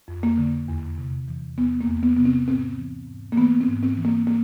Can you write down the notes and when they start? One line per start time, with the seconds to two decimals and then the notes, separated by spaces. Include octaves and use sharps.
0.08 F2
0.23 A#3
0.38 D3
0.68 E2
0.98 C3
1.28 E3
1.58 E2 B3
1.81 A#3
1.88 E2
2.03 B3
2.17 C3 B3
2.25 C4
2.47 G#2 C4
2.78 E3
3.08 G#2
3.32 A#3
3.38 E3 B3
3.61 C4
3.68 G#2
3.83 C4
3.98 E3
4.05 A#3
4.27 A#3